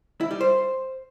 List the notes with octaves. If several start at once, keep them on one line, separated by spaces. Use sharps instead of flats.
E4
G3
C5